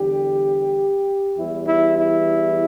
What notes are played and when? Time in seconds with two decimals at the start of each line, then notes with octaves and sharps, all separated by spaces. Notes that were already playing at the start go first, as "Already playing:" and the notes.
Already playing: E2 D3 G3 G4
1.38 E2 E3 G3 E4
1.67 E4
1.98 E4